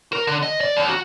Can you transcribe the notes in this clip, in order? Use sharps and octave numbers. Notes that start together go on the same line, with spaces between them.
A#4
D3
D#5
D5
D#2
F#4